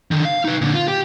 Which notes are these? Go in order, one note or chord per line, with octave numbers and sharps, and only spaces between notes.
D3 D#3
F5
D#4 B4
A#2 D3
F4
G4